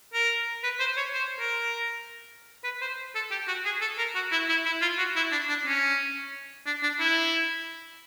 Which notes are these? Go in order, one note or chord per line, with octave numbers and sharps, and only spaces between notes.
A#4
B4
C5
C#5
C5
A#4
B4
C5
A4
G4
F#4
G#4
A4
A#4
F#4
E4
E4
E4
F4
F#4
E4
D4
D4
C#4
D4
D4
E4